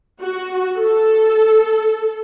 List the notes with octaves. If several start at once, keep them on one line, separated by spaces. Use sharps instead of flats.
F#4
A4